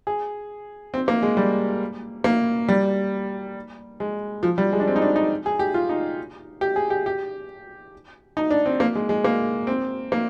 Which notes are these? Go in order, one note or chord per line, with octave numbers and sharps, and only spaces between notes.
G#4
C4
A#3
G#3
G3
A#3
G3
G#3
F3
G3
G#3
D4
C4
D#4
D4
D#4
G#4
G4
F4
D#4
G4
G#4
G4
G4
D#4
D4
C4
A#3
G#3
G#3
A#3
C4
A#3